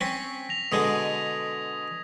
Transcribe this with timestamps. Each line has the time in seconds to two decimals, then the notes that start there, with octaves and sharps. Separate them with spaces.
0.01 C4 C#4 B6
0.49 A#6 F7
0.72 B2 D3 G#3 D#6 G#6 A#6